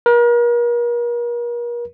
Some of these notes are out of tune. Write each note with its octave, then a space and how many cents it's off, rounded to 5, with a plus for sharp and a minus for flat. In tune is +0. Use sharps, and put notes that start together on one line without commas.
A#4 +40